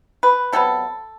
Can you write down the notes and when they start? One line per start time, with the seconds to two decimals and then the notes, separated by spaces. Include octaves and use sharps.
0.23 B4
0.52 C3 F#3 B3 A4